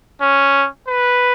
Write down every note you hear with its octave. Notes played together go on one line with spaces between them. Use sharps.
C#4
B4